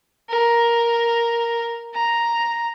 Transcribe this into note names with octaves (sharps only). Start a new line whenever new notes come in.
A#4
A#5